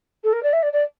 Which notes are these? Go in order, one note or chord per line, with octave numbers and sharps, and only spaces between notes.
A4
A#4
D5
E5
D5
D5